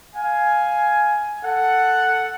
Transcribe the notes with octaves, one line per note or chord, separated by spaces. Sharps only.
F5 G#5
A4 F#5